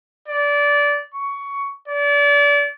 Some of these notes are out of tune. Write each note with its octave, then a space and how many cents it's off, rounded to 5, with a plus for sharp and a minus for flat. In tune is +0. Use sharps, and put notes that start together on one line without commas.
D5 -20
C#6 +15
D5 -30